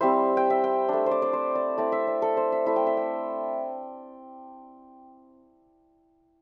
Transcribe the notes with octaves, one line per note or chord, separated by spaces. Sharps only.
G3 C4 E4 C5
G5
E5
G5
A3 D4
C5
D5
D5
C5
D5
A3 C4 E4 D5
E5
D5
A4
C5
E5
A3 E4
G5
E5
G5